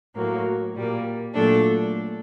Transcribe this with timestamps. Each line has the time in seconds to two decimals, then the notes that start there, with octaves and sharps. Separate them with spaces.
0.15 A2 F#3 A#3
0.75 A#2 G3 A#3
1.34 A#2 F#3 A3 D4 A4